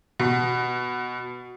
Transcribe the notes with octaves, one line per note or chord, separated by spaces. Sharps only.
B2